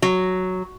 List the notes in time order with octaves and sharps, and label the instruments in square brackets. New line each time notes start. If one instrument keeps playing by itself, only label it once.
[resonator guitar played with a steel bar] F#3